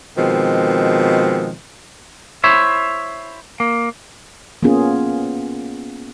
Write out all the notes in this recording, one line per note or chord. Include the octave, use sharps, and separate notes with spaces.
B2 D#3 F3 G#3 C4
E4 C5 C#5 E5
A#3
A#3 B3 C#4 F4 G#4